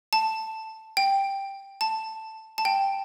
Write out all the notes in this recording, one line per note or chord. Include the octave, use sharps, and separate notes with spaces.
A5
G5
A5
A5
G5